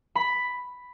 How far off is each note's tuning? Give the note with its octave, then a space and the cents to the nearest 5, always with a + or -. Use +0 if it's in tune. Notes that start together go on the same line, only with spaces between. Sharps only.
B5 +5